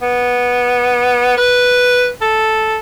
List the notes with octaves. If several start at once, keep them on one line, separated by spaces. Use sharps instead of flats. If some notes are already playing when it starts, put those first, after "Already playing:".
B3
B4
A4